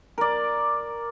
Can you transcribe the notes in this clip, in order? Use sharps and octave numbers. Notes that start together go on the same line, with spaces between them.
A#4 D5